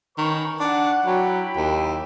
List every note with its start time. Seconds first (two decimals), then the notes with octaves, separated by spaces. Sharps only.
0.18 D#3 C#4 B4 C#6
0.60 D4 F#5
1.06 F#3 E4 G5 B5
1.57 D#2